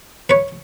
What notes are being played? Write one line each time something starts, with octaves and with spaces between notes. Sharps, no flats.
B4 C#5